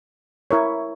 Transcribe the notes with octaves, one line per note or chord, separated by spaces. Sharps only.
E4 A#4 C#5